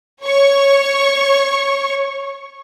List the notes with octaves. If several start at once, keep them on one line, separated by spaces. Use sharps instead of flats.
C#5 C#6